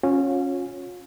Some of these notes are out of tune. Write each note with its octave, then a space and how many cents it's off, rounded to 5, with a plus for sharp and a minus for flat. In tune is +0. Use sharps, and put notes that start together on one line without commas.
C#4 -10 F4 +40